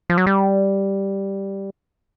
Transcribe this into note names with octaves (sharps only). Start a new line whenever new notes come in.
F3
F#3
G3